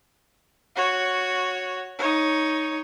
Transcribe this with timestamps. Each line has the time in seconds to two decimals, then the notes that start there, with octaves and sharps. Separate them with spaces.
0.75 F#4 C#5
1.99 D#4 C#5